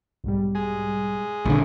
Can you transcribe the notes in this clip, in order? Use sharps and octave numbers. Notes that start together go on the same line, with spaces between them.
B1 G#2 G3
G#3 G#4
A#1 D3